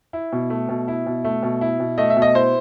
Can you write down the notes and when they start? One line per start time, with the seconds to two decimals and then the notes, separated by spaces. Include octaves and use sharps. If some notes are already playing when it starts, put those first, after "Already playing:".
0.13 E4
0.32 B2
0.50 A3
0.69 B2
0.88 E4
1.06 B2
1.24 A3
1.43 B2
1.61 E4
1.80 B2
1.98 A3 D#5
2.10 E5
2.17 B2
2.22 D#5
2.35 E4 C5